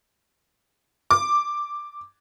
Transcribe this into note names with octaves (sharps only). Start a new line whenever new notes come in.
D6